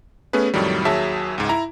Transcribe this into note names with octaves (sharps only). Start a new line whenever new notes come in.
A3 B3 C#4 G#4 B4
F2 A2 D#3 F#3 G3
D#2 F#3 G#4 E5 A5
C#2 G#2
E4 A#5